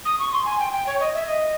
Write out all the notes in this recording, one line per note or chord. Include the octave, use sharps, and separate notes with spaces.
D#6
C#6
C6
G#5
G5
G5
C#5
D#5
E5
D#5